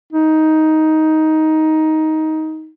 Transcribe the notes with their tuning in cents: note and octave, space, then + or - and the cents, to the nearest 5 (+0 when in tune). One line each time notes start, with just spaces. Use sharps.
D#4 +10